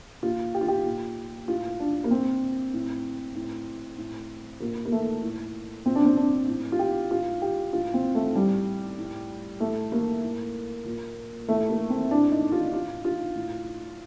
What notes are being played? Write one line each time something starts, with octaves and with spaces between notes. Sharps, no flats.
A#2 F4
G4
F4
G4
A#2
A2 F4
D4
A#3
A#2 C4
A2
A2
A2
A#2 A#3
A#3
A3
A2
A#2 C4
D4
C4
D4
A2
F4
G4
A2 F4
G4
A2 F4
C4
A3
A2 G3
A2
A2 A3
A#3
A2
A#2
A2 A3
A#3
C4
A2 D4
D#4
F4
A2 F4
F4
A2